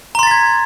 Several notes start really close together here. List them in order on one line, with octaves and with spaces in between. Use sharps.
A#5 C6 A6 B6 G#6